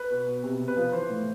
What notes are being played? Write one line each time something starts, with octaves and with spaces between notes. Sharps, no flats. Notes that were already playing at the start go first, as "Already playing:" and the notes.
Already playing: B4
B2
B2
C3
C3
B4
F3
E3 C5
A2